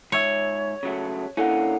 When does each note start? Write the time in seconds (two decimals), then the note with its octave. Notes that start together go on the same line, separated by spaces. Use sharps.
0.12 G#2 C#5 E5
0.83 C#3 F#3 A3
1.37 D3 A#3 C#4 E4 A4 F#5